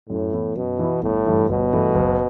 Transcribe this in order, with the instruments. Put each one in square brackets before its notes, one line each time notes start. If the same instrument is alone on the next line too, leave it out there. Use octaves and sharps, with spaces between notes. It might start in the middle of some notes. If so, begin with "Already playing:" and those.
[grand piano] F#2 [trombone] A2
[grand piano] E3 B3 E4
[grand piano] F#2 [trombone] B2
[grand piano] E3 B3 E4
[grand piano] G1 [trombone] A2
[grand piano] G2 E3 A3
[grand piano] G1 [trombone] B2
[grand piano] G2 E3 A3
F#1